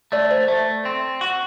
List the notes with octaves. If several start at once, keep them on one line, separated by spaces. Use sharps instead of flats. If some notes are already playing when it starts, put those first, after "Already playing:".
A3 D5
C5
A3
C4
F#4